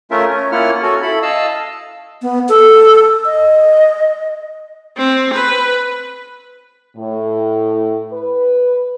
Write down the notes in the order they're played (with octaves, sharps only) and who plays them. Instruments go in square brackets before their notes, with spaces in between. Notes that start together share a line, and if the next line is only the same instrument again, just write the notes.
[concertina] A3 C#4 F4 A#4 E5
C#4
A#3 C#4 E4 F4 F#5 F6
C#4 F#4 A4
E4 A4 B5
D#5 F5 A5 E6
[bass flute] B3
A4
D#5
[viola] C4
B4
[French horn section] A2
B4